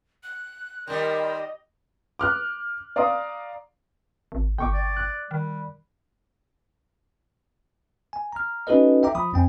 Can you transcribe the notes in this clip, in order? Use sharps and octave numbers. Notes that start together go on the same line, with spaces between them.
F#6
D#3 G3 A#4 D5 D#5 C6 G6
D6 F6 F#6
D5 F5 A#5 C6 D#6
G#1
G1 G5 C#6 D6
D5
F#6
D#3 G3
G#5
A#5 F6
C#4 D#4 F#4 A4 B4 D#5
E5 G5 A#5 D6
F3 B5 D#6
F2 C4 G5 G#5